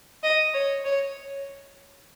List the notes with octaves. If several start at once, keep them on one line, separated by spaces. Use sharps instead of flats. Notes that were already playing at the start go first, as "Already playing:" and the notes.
D#5
C#5
C#5